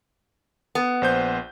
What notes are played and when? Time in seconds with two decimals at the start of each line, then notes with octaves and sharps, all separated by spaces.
0.75 B3
1.02 A#1 C5 G6